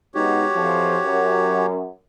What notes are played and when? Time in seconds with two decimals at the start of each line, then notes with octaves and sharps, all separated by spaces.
0.15 G#2 B3 D#4 F#4 G4 C#5
0.54 F2 E3 F3
1.04 F#2